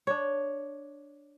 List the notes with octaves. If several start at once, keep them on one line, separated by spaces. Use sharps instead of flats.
D4 C#5